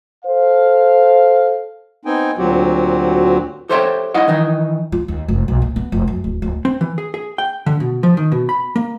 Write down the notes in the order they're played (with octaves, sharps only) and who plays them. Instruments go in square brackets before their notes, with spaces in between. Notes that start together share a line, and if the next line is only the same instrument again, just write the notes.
[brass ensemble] A4 C5 F5
[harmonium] B3 C4 D#4 G5 G#5
D2 A#2 F#3 C4 F#4 G4
[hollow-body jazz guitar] G4 A4 C5 C#5 E5 G5
D#4 E4 D#5 F5 F#5
D#3 E3 D#4
[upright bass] F4
D#2
F1
B1
A#2
B3
F1
F#2
D1
D1
[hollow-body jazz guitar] C4
E3
G#4
G#4
G5
D3
B2
F3
D#3
B2
B5
A#3